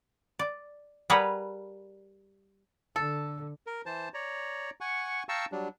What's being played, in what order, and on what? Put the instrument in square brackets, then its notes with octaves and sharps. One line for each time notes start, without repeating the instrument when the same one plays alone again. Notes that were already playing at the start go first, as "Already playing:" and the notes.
[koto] D5
G3 G#4 A#4 B4 F#5
[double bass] D3 [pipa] A4
[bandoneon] A#4
E3 C5 A5
C#5 D5 A#5
F#5 G#5 C#6
F5 G5 A5 A#5 C#6 E6
F#3 G3 D4